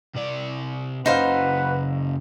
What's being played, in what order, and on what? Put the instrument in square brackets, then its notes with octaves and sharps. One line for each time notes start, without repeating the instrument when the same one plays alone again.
[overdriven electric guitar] C3 D5
[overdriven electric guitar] F#2 C#3 [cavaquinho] D#4 C5 F5 [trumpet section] B4 F#5